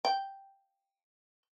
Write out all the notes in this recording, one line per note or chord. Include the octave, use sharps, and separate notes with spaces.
G5